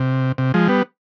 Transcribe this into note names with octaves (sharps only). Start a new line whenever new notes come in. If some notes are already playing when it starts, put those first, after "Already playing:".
Already playing: C3
C3
F3 G#3
G3 B3